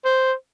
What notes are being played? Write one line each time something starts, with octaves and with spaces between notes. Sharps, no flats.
C5